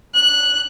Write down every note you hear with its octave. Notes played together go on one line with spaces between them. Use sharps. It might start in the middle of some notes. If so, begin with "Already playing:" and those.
F#6